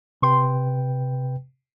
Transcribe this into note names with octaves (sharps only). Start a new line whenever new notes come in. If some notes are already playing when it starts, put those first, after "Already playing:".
C3 B4 G5 C6